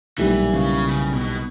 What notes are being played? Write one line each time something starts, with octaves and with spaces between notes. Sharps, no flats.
B1 A#2 E3 G3 B3 E4
C#3
C#3
B2